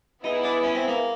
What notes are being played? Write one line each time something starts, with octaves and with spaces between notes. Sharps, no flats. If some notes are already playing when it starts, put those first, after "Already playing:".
B3 D#4 E4 G#4
D4
C#4
C4
A#3